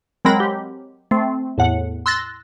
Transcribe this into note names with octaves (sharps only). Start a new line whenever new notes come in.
F#3 G#3 C4 A#4 B5 A#6
G4
A3 C4
E2 A2 F#5
C6 E6 F#6 A6 A#6